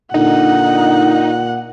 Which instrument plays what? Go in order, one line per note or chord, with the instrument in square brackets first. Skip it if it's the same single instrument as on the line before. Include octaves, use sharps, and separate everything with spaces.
[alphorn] A#2 [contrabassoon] D3 [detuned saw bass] D#4 [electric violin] F#5